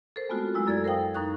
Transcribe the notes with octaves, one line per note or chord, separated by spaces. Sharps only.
A4 A#4 C5
G#3 A3 B3 C4 F4 F#4
F#3 G#3 E4 F#4
F#2 A4 D5 E6 G#6
A#4 C5 F5 G5 D#6
F#2 D#4 C#6 D#6 F#6